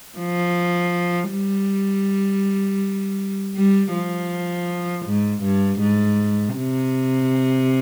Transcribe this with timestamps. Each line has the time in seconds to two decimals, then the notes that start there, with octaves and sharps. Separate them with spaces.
0.18 F3
1.30 G3
3.56 G3
3.93 F3
5.06 G#2
5.43 G2
5.81 G#2
6.56 C3